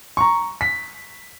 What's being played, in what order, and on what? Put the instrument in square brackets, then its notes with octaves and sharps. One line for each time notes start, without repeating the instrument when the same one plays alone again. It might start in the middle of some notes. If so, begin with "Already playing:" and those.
[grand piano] A#5 C#6
B6